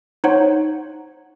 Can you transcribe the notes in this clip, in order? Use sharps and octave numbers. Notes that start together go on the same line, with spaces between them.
D#4 C5 C#5 F#5